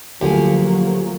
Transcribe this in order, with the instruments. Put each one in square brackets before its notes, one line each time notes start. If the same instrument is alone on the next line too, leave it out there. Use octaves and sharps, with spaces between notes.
[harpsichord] D2 [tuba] F3 [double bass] F#3 A#3 [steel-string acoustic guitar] G4 F#5 G#5